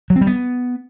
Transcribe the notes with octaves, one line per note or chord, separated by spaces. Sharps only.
F#3
C4
G3
B3